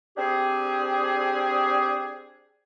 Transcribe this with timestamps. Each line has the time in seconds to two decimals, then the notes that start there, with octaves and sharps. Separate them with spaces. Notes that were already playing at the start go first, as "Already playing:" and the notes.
0.17 C4 D4 G4 G#4